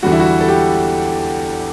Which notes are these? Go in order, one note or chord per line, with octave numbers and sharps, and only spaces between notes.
E2 D3 G3 F#4
E4
F#4
A4
G4